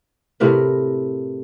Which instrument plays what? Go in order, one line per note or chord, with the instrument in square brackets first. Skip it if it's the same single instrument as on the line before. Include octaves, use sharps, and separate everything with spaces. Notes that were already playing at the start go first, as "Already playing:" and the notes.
[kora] A2 C3 A#4 B4